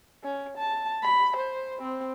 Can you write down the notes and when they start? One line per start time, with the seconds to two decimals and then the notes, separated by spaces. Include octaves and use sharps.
0.23 C#4
0.57 A5
1.02 B5
1.36 C5
1.82 C4